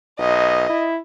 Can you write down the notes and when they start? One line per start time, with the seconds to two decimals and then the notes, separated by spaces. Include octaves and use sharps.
0.19 B1 D#5
0.69 E4